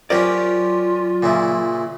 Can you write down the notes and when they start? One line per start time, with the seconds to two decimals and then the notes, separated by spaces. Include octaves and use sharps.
0.10 F#3 C#4 F4 G4 A#4 C5 D5
1.23 A#2 C#3 E4